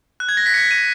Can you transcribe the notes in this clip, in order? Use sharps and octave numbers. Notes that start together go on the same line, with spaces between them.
F#6
G#6
A#6
B6
C#7
D#7